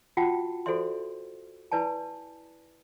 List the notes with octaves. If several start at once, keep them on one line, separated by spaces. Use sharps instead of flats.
F4 F#4 F#5 G5 A5
F#4 A4 C5 D5 E5 C6
E4 B4 D5 G#5 A5